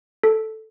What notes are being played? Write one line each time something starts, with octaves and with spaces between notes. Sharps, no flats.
A4